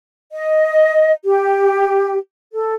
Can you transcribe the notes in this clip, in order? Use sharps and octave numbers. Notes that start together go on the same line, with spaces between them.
D#5
G4
A4